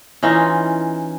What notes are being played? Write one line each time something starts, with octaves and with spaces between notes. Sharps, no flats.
E3 C#4 D#4 F4